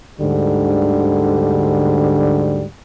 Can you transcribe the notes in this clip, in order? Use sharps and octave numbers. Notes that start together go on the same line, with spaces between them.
D2 G#2 D3 G3